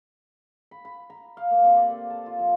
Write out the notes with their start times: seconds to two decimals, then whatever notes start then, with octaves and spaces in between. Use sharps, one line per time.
0.71 B5
0.85 B5
1.10 A#5
1.37 F5
1.51 A#3
1.64 C3
1.77 D5
1.90 A4
2.10 A5
2.26 F4
2.39 F3